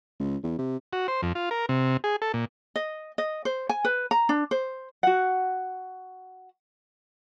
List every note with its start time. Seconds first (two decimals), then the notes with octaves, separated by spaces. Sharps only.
0.20 C#2
0.44 E2
0.59 C3
0.93 F#4
1.08 C5
1.22 F2
1.35 F4
1.51 A#4
1.69 C3
2.04 G#4
2.22 A4
2.34 A#2
2.76 D#5
3.18 D#5
3.45 C5
3.69 G#5
3.85 B4
4.11 A#5
4.29 D4
4.51 C5
5.03 F#4 F#5